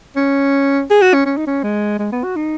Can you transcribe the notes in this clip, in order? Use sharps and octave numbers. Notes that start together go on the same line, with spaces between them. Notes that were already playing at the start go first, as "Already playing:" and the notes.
C#4
G#4
F#4
C#4
C#4
D#4
C#4
G#3
G#3
B3
F#4
D#4